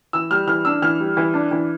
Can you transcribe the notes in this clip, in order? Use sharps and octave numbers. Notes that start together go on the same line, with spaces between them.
E3 E6
G3 F6
E3 F6
D4 E6
E3 F6
G3
E3
D4
E3